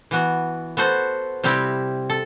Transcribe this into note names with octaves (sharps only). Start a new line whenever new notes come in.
E3 B3 F#4
B3 F#4 A4 C5
C3 G3 C4 E4 G4
A4